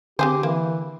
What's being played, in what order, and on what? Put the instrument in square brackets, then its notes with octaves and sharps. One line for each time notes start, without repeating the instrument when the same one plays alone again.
[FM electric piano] D3 [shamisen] C4 G#4 C5 [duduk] G4
[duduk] E3 [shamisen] A#3